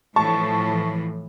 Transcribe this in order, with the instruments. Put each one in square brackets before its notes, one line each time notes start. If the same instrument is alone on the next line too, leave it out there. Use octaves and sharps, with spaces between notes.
[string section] A2 E3 F3 [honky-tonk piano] A5 C#6